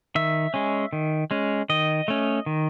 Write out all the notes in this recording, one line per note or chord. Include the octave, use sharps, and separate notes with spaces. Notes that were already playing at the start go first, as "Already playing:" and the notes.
D#3 E5
G#3 C#4
D#3
G#3 C#4
D#3 D#5
A3 C#4
D#3